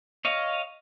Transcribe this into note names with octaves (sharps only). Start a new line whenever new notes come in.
C#5 D#5 F5